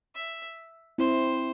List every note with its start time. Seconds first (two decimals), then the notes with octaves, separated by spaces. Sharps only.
0.15 E5
0.98 C4 E4 C5